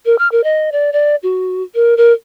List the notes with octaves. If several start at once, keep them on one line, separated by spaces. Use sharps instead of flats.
A#4
F6
A#4
D#5
D5
D5
F#4
A#4
A#4